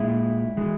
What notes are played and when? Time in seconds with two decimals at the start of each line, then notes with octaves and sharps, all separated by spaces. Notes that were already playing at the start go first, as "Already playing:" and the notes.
Already playing: A#2 G#3 E4
0.57 E3 G#3